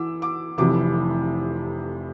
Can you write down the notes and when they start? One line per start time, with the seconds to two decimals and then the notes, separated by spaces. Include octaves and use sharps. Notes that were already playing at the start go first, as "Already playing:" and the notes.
Already playing: E3 D6 E6
0.22 D6
0.58 F1 F2 C3 E3 D6